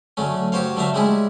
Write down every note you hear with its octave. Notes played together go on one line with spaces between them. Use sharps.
D3 F#3 A3 C#4
F#3 F#4 G4 C5 C#5 F5
D3 F#3 A3 E5 F5 A#5
G3 G#3 C#4 E4 G#4